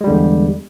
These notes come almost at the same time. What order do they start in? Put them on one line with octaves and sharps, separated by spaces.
G#3 G3 D3 E2